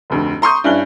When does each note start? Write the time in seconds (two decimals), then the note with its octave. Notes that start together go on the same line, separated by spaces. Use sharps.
0.10 F1 D2
0.42 A#5 C6 C#6 D#6 G6
0.64 G2 C#4 E4 F#6 G7